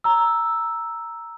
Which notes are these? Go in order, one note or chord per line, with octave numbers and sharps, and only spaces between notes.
A#5 E6